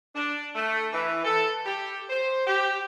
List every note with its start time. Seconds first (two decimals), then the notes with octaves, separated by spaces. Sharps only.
0.15 D4
0.55 A3
0.93 E3
1.25 A4
1.65 G4
2.10 C5
2.47 G4